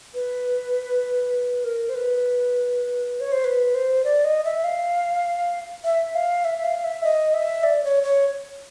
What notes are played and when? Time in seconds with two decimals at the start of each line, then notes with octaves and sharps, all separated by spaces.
0.15 B4
1.64 A#4
1.89 C5
1.95 B4
3.20 C#5
3.32 C5
3.44 B4
3.75 C5
4.04 D5
4.24 D#5
4.44 E5
4.64 F5
5.84 E5
6.15 F5
6.45 E5
6.64 F5
6.84 E5
7.04 D#5
7.33 E5
7.63 D5
7.84 C#5
8.04 C#5